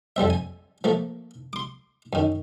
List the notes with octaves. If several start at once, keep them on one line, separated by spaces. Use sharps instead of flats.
F2 G3 C4 E5
G#5
F3 A3 A#3
C6 D6
F#2 D#3